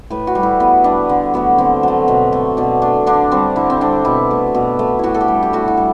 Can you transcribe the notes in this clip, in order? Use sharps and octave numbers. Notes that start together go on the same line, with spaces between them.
A2 B4
F#4
G3
E4
A2 B3
G3 D4
D3
F#3 A3 B3
D3 C4
F#3 A3
B2
A3
B2 D4
A3 D4
D3 D4
G3 C4
D3 E4
C4
G3 D4
B2 E4
A3
B2
A3
A2 E4 F#4
A4
G4
G3
G4
A2 F#4
E4
G3